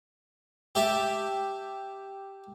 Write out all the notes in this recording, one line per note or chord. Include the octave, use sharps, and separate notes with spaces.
G4 E5 A5